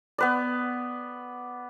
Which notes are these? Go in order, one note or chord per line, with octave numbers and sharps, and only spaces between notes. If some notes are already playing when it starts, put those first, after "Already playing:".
B3 B4 D5